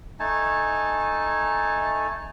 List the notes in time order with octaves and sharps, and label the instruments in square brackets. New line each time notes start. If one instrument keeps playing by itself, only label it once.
[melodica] A3 D#4 G#5 A5